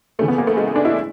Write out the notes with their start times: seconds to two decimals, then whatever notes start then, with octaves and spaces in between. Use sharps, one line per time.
0.19 C#2 C#3 E3 A3
0.28 B3
0.38 A#3
0.47 A3
0.57 G#3
0.76 D4
0.85 E4